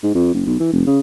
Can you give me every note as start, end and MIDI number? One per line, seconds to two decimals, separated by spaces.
0.03 0.15 44
0.15 0.34 41
0.34 0.44 30
0.46 0.58 35
0.60 0.72 52
0.73 0.86 29
0.87 1.00 49